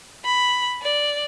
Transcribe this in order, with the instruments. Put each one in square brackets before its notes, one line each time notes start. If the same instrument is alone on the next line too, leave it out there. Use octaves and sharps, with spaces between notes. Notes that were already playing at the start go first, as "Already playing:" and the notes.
[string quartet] B5
D5